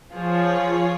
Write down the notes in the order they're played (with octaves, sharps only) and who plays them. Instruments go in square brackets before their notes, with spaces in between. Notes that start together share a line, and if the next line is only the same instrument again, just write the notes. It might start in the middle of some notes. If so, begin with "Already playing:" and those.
[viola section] F3 [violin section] F4 G#4 C#5